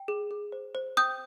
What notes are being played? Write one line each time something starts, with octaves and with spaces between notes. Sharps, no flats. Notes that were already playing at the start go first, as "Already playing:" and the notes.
Already playing: G5
G#4
G#4
C5
C5
G5 D#6 G6